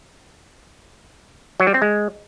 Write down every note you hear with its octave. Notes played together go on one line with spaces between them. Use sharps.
F#3
G3
C4
G#3